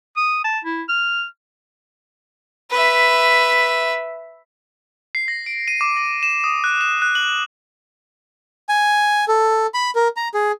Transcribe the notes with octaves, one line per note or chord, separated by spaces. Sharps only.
D#6
A5
E4
F6
B4 E5
C7
A#6
D7
D#7
D6
A#6
E7
D#6
F#6
E7
F#6
F#7
G#5
A4
B5
A#4
A#5
G#4